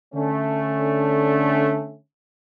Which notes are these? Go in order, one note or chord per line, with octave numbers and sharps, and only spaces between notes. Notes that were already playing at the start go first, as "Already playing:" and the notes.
D3 A3 C#4